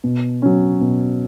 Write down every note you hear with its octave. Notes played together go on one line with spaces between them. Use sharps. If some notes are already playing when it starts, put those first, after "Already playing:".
B2
F#3 C#4
B2